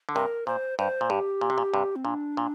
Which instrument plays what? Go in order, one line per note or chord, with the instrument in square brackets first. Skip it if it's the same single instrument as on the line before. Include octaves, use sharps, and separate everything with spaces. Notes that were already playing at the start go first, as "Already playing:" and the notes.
[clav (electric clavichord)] D3
[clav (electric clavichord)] G2 C3 [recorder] A#4
[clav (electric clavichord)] A#2 [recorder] C5
[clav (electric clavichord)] G2 [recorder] C5
[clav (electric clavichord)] A#2
[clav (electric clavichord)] G2 [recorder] G4
[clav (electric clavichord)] A#2
C3
A#2
G2 C3
[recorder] C4
[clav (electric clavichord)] A#2 [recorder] D4
[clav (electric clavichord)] A#2